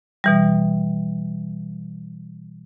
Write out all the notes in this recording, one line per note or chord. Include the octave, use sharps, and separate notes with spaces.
B2 E3 G3